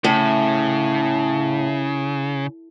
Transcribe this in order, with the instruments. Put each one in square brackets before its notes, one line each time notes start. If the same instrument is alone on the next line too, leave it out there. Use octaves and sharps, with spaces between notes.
[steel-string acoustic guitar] A2 [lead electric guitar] C#3